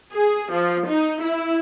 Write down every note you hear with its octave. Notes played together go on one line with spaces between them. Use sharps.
G#4
F3
D#4
E4